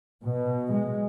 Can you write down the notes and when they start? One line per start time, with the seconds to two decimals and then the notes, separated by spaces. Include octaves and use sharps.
0.24 B2
0.72 G#3